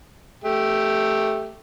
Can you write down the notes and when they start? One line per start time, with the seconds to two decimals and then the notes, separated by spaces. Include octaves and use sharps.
0.44 A3 G4